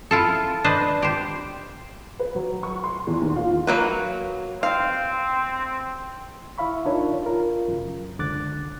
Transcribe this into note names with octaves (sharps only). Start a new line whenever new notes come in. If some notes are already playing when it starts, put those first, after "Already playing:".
E4 F4 A4
D4 B4 C5 D#5
G4 C5
B4
F#3
C#6
C6
E2
D#2
F4
F#3 A#3 B4
C4 F5
E4 E5 F5 B5 C#6
D4 D#4 F4 A#4 C#5
F4 A#4
F#2 C#3
C#2 D3 D6 F#6 A6